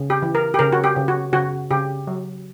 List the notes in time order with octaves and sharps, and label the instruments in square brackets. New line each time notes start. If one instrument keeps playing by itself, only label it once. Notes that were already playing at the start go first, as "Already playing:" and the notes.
Already playing: [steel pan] C#3
G4
E3
A#4
G4
C#3 A#4
F#4
G4
C#3
F#4
C#3 F#4
C#3 G4
F#3